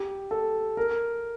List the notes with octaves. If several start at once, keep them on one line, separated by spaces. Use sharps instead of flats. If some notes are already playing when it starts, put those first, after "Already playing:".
Already playing: G4
A4
A#4